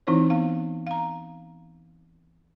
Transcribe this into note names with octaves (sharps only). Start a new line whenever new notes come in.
E3 C4 D#4 E4 C5 C#5
B3 F5
F5 A#5